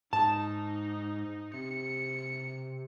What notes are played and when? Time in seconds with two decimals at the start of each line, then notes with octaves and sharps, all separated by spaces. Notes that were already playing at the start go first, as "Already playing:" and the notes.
0.13 G#2 D#4 A5
1.53 C3 C#7